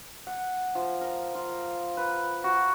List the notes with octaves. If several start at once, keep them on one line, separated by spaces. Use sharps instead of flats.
F#5
F3
A#4
F4
B4
F#4